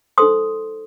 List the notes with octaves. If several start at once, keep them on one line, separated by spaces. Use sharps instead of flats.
D#4 A4 C5 C6 D#6